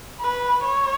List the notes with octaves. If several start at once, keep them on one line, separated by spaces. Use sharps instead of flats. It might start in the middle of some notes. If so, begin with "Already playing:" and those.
B4
C#5